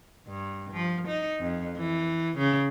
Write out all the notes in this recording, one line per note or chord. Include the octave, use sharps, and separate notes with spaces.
G2
F3
D#4
F2
E3
C#3